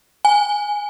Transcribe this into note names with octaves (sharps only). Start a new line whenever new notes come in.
G#5